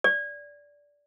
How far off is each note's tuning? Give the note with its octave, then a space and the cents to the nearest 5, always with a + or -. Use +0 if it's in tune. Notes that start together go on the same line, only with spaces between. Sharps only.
D5 -15